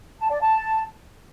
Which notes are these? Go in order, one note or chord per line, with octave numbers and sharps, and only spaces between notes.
A5
D5
A5